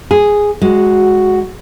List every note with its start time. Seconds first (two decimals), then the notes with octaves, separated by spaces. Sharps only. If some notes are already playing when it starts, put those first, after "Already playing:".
0.11 G#4
0.62 G#3 F#4